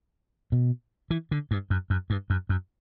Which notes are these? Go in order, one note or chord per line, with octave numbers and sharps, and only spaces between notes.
B2
E3
D3
G2
F#2
F#2
G2
F#2
F#2